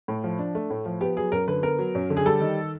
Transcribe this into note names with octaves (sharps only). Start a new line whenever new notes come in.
A2
F3
D4
A3
A2
F3
B3 G4
F#3 G#4
F#2 A#4
D3 B4
B3 A#4
F#3
F#2
D3
G#4
G3 A4
D#3